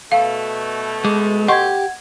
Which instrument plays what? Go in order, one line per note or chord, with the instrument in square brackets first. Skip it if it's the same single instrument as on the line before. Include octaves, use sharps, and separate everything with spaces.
[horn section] B2 A3 [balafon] F5
[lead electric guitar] G#3 [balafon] D6
[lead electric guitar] G4 [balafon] D#5 C6 C#6 [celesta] F#5 G#6